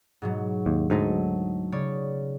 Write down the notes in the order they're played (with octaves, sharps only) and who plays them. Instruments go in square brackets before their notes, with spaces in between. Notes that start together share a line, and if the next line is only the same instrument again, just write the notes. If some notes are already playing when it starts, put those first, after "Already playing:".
[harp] G#2 B2 F#3
[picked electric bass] D#2
[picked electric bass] D2 G#2 [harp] F#3 A3 D#4
[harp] C#3 C#5 D5